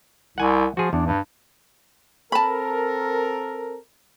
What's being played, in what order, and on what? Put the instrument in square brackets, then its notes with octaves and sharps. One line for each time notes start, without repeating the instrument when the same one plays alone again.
[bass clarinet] C2 [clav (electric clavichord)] F#5 G#5
[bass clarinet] F3 [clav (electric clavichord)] F#4 G#4
[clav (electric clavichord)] E2 [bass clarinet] D4
[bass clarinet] G2
[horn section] C4 A4 A#4 [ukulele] A5 B5